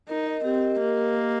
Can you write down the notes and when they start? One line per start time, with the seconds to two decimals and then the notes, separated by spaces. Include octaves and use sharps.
0.09 D#4 A#4
0.27 D#5
0.44 C4 G4
0.62 D#5
0.80 A#3 D#5
0.98 A#4
1.15 A#4